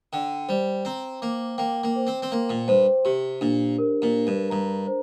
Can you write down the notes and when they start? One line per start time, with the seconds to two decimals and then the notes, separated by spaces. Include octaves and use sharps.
0.13 D3 G5
0.48 G3 C5
0.85 C4 A#5
1.22 A#3 D6
1.58 A#3 G5
1.83 A#3
1.96 C5
2.07 C4
2.22 C4
2.32 A#3 C6
2.50 A#2
2.68 G2 C5
3.05 C3 G4
3.41 A#2 D4
3.78 A#4
4.02 A#2
4.15 D4
4.27 G2
4.50 G2 A#5
4.87 C5